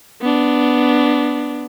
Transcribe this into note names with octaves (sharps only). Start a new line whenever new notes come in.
B3 D4